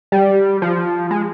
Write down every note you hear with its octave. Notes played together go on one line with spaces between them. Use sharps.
G3
F3
G#3